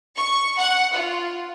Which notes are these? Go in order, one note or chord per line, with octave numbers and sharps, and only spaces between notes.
C#6
F#5
F4